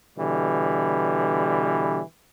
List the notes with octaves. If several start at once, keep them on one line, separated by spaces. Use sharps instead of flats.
B2 D3 E3 G3